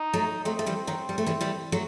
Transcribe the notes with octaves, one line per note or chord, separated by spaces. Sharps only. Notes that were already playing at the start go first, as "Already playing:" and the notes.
Already playing: D#4
F#3 A3
F#3 A3 C4
A3
E3 G3
D#3 F#3
G3
A3
E3 G3
E3 G3
F#3 A3